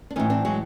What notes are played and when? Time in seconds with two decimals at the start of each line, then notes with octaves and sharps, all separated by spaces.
0.10 D4
0.16 A2 E3 C#4 D#4
0.30 C4 D4
0.45 F#3 G#3